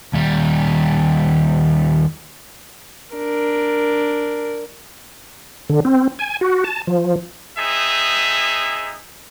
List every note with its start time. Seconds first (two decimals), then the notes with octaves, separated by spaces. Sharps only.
0.13 D#2 G3
3.15 D4 A#4
5.69 D3
5.85 C4
6.19 G#5
6.41 F#4
6.64 A5
6.87 F3
7.58 C4 D#4 G#4 E5